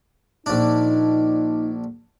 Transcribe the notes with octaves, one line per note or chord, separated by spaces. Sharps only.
A#1 D4 D#4